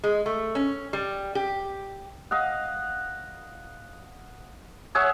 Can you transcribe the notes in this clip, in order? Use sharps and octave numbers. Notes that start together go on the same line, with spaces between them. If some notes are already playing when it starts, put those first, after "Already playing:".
G#3
A3
C#4
G3
G4
D#5 F5 F#5
G#4 C#5 E5 F#5